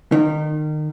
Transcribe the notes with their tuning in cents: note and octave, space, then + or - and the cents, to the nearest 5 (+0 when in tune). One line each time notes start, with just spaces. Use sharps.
D#3 -30